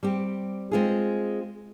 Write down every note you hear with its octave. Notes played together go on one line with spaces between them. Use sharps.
G3 C4 G4
G#3 C4 F4 G#4